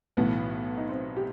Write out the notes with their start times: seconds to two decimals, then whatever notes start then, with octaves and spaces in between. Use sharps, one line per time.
0.17 B1 A2 E3 B3
0.78 D#4
0.89 C4
1.17 G4